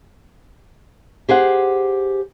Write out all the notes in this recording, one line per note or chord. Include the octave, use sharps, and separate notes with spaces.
G4 G#4 C5 F#5